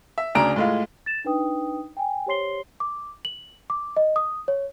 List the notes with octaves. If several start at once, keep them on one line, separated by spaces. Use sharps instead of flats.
E5
D2 C#3 D4 A#5 D7
A2 G#3 F4
A6 E7
D4 D#4 B4 G5 D#6
G5 G#5
G4 C5 C#5 C6 C7 G7
D6
F#7
D6
D#5
D#6
C#5